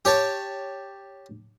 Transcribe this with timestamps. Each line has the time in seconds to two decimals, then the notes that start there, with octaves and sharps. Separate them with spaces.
0.05 G4 C#5 A5